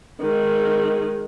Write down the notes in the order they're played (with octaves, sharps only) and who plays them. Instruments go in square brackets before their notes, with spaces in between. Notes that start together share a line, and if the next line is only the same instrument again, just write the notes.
[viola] D#3 G#3